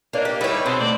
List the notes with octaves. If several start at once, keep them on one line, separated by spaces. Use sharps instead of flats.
A#3 D4 B4 C#5 D#5 F5
G4
G3 D#4 E4 G#4 B4 C#5
B2 B3 C4
D3 A3 C5 D5